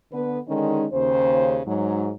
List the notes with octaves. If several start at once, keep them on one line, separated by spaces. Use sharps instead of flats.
D3 B3 B4
D3 D#3 G#3 C#4 D#4
D#2 C#3 C5
G#2 F#3